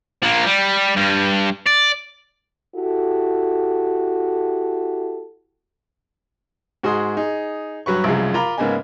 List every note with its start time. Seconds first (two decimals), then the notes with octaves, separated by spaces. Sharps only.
0.23 F3 A#3
0.47 G3
0.96 G2 G3
1.67 D5
2.75 E4 F#4 G4 A4
6.83 G#2 F#4 G#4 D#5 C6 D#6
7.17 D#4 G#4
7.86 G2 F#3 B4 C#6
8.04 C2 F#2 C#3 F3 G#3
8.34 F4 A#4 A#5 B5 D6
8.58 G#2 C#3 A#3 B3 D#5 G#5